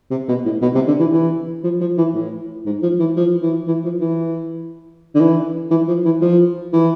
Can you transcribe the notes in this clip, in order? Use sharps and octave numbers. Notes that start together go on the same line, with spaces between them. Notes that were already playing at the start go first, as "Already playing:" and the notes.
C3
B2
A2
B2
C3
D3
E3
E3
F3
F3
E3
A2
G#2
F3
E3
F3
E3
E3
F3
E3
D3
E3
E3
F3
E3
F3
E3